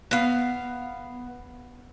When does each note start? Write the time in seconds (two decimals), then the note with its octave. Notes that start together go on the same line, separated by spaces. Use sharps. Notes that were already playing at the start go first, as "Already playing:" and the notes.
0.11 B3 F5